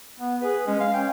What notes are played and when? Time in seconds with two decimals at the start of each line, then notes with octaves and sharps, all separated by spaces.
0.20 B3
0.42 G#4 B4
0.67 G#3 C#4
0.80 G#3 F5
0.94 C#4 G5